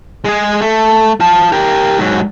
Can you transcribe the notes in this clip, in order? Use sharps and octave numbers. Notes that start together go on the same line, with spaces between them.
G#3 G#4
A3
F4 A5
G4 A#4
G#2 F#3